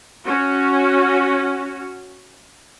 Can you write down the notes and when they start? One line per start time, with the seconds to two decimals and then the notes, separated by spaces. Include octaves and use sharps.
0.24 C#4 F#4